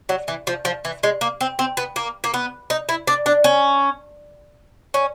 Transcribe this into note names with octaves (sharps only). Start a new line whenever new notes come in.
F#3
E3
F3
F3
E3
G#3
A#3
C4
C4
B3
A#3
A#3
B3
D#4
E4
D4
D4
C#4
C#4